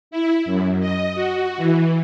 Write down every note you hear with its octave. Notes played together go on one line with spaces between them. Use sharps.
E4
F#2
D#5
F#4
E3